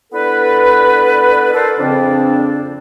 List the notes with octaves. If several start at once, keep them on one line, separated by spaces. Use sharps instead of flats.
B3 D4 E4 A4 B4
A4 A#4 C5 D5
F2 C#3 C4 D4